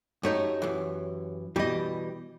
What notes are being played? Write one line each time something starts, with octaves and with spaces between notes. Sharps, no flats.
F#2 A3 D#4 G4 C#5
F#2 E3
B2 E3 G3 G4 D#5